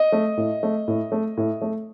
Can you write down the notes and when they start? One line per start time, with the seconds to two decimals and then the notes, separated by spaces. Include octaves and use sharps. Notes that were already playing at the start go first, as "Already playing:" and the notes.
Already playing: D#5
0.12 A3
0.37 A2
0.63 A3
0.88 A2
1.12 A3
1.37 A2
1.62 A3